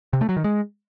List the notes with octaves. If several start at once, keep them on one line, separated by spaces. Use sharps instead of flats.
C3
A3
F#3
D#3
G#3